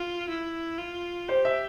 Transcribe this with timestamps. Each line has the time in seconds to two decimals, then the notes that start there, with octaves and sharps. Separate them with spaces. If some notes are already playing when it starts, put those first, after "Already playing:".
Already playing: F4
0.29 E4
0.78 F4
1.28 G4 C5
1.45 E5